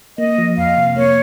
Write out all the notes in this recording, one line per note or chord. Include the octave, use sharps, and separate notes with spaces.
A#3 D#5
F3
F2 F5
C3
A#3 C#5